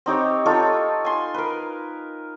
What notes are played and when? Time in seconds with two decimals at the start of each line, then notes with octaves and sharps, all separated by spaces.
0.06 C4 D#4 G4 C#5
0.46 D#4 F4 A4 C#5
1.05 G#5 C6
1.34 A#4 B4